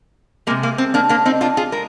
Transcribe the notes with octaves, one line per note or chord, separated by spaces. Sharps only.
C3 F3 G#3 A#3
A#3
C4
A#3 D4
A#3 D4
C4 D#4
D4 F4
F4 G#4
G#3 A#4